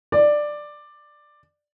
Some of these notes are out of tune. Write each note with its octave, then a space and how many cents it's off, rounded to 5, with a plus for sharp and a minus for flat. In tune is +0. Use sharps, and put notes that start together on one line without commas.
D5 +10